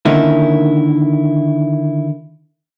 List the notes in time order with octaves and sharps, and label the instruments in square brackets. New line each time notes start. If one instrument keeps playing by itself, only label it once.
[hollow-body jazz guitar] D3 D#3 A#3 C#4 D#4 E4